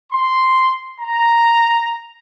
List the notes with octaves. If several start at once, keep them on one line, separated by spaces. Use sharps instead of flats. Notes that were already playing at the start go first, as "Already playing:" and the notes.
C6
A#5